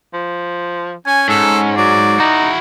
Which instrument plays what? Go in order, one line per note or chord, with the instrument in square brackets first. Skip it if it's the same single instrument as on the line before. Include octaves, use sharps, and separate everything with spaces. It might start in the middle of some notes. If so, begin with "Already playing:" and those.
[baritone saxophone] F3
[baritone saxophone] C#4 [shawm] G#5
[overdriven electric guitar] G#2 [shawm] A4
[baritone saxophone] F#3 [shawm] D5
[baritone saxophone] D#4 [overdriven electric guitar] E4 F#4